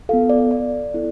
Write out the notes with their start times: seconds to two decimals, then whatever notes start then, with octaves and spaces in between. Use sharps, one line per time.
0.09 B3 F4 A4 F5
0.30 D5
0.51 D5
0.94 B3 E4 A4